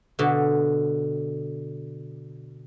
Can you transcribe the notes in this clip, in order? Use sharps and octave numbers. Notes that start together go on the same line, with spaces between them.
B2 D3